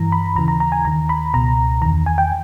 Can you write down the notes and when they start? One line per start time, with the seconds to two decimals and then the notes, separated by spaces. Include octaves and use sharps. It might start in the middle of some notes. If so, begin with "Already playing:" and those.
Already playing: G2 E3 A#5
0.12 B5
0.35 D#2 C#3 E3 A#5
0.48 A#5
0.60 A#5
0.72 G#5
0.85 D#2 D#3 A#5
1.09 B5
1.34 C#2 B2 A#5
1.81 D#3 A#5
1.86 E2
2.06 G#5
2.18 G5